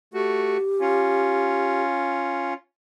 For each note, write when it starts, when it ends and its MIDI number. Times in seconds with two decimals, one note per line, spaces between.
0.14 0.57 57
0.14 0.57 66
0.14 1.83 67
0.80 2.54 61
0.80 2.54 65